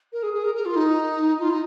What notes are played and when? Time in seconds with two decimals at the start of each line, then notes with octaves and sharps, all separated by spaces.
0.12 A#4
0.23 G#4
0.34 G#4
0.44 A#4
0.55 A#4
0.65 F4
0.76 D#4
1.39 F4
1.50 D#4